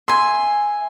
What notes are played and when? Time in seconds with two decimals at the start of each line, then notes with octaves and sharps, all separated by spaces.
0.08 E5 G#5 C6